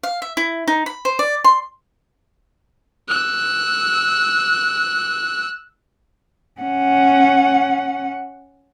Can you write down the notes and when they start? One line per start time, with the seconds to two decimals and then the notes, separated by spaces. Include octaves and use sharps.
0.03 F5
0.22 E5
0.37 E4
0.68 D#4
0.86 B5
1.05 C5
1.19 D5
1.44 C6
3.09 E6 F#6
6.61 C#4 F#5